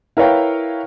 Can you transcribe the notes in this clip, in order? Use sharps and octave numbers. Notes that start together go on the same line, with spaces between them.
E4 A#4 B4 C#5 F5 G5